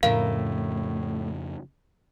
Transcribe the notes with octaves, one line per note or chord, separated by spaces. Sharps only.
F2 A2 C#3 E4 A#4 F5